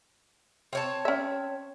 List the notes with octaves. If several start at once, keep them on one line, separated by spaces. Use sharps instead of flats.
C4 C#5 A5
C#4 E5